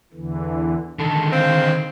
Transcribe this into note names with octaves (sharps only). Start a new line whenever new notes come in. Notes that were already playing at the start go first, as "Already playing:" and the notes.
E2 D3 E3
D3 D#3 G#3 A4
C4 F5